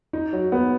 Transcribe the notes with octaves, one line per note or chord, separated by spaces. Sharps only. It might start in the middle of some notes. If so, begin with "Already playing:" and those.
D#4
F#3
B3